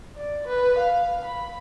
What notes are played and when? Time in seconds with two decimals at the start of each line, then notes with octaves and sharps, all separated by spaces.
0.17 D5
0.47 B4
0.78 F5
1.25 B5